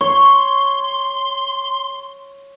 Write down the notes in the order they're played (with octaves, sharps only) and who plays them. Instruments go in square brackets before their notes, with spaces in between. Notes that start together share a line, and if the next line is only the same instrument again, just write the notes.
[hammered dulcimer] C#5 [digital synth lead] C6